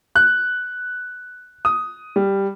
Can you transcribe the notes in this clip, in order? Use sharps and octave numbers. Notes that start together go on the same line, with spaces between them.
F#6
D#6
G3